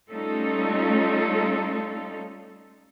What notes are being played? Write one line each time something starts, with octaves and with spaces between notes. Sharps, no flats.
G3 A3 C#4 D#4 F4 A4